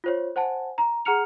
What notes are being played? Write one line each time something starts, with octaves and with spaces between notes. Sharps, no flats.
F4 C5 C#5
C5 F#5 G#5 A5
A#5
G#4 F#5 A#5 F6 C#7 F7